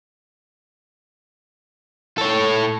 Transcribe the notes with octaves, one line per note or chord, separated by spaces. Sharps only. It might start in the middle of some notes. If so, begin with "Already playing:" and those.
A4 C#5